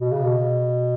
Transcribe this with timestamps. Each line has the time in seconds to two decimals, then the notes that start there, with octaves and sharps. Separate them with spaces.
0.01 B2
0.11 C#3
0.23 B2